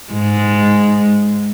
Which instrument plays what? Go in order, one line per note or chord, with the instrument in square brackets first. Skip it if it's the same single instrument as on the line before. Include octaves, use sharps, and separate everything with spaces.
[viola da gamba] G#2 G#3